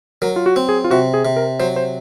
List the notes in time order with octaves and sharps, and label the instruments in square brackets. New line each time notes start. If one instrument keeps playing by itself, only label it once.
[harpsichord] F#3 [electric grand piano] A#4
[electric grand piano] F4
F#4
[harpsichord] C4
[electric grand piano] G#4
F4
[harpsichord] C3 [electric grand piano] F#4
[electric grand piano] G#4
[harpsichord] C3
[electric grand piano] A#4
[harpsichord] F#3 [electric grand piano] C5
[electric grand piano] C5